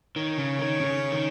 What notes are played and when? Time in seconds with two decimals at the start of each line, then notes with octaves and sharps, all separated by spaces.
0.16 D#3 C#5
0.37 C#3
0.59 D#3
0.80 C#3
1.12 D#3